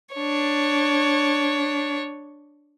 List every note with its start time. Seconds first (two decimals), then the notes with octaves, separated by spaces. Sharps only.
0.15 D4 C#5